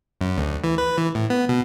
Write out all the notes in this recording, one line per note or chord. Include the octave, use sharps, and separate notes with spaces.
F#2
D2
E3
B4
E3
A2
B3
B2